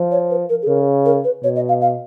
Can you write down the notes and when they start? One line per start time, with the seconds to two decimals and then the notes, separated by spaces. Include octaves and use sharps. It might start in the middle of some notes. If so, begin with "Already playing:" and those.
Already playing: F3
0.11 C#5
0.30 B4
0.49 A#4
0.62 G#4
0.67 C#3 A#4
1.05 A#4
1.24 B4
1.43 B2 C#5
1.56 D#5
1.69 F5
1.81 F5